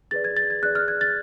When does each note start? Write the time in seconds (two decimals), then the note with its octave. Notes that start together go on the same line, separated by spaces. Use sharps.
0.11 G#4 B4 D5 A6
0.24 G#6
0.37 A6
0.50 G#6
0.63 G#4 B4 D5 F#6
0.75 F6
0.88 G#6
1.01 A6